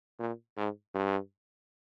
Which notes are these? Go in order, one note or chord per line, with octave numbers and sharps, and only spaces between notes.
A#2
G#2
G2